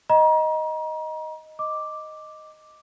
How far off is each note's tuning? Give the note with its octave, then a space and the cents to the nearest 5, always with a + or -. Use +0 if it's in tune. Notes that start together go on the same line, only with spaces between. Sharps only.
D#5 +5 A#5 +35
D#5 +0 D6 +0